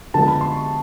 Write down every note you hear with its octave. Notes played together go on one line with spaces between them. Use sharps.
D3 F3 G#3 B3 A5
B5
C6
C#6